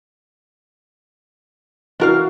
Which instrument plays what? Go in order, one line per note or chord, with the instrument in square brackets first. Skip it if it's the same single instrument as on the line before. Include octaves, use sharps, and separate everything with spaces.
[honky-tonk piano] E3 F#4 [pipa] D4 A#4 F5